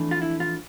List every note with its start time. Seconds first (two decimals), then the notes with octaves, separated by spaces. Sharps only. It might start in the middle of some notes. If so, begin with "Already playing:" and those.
Already playing: F2 E3 A3 D4
0.11 F4
0.22 E4
0.40 F4